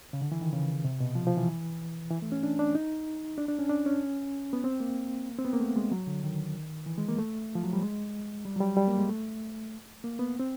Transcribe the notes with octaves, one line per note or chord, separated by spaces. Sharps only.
C#3
D3
E3
D#3
C#3
C3
B2
F3
F3
E3
E3
A3
C#4
D4
D4
D#4
D4
D4
C#4
D4
C#4
B3
C4
A#3
C4
B3
A#3
A3
G#3
F#3
D3
D#3
E3
G#3
A#3
A3
F3
F#3
G3
G#3
G3
F#3
G3
G3
A#3
G#3
A3
A#3
B3
C4